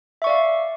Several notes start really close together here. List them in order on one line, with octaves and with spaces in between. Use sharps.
E5 C#6 D5 F5